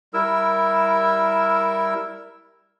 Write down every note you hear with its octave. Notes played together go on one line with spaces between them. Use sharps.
G3 E4 A#4 E6